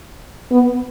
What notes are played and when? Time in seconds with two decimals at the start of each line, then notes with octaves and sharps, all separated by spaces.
0.51 B3